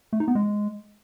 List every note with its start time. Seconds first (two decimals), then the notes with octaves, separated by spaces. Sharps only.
0.13 A3
0.20 D#4
0.28 B3
0.35 G#3